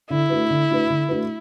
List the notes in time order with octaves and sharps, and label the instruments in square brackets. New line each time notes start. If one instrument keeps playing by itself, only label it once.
[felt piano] D3 [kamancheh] E4
[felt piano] A3 D4 F#4 B4
D3
A3 D4 F#4 B4
D3
A3 D4 F#4 B4